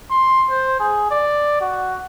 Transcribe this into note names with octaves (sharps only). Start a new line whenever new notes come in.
C6
C5
G#4
D5
F#4